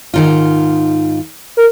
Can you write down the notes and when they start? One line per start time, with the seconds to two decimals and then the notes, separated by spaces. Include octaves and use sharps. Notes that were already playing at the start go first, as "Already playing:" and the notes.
0.14 G#2 D#3 F4
1.57 A#4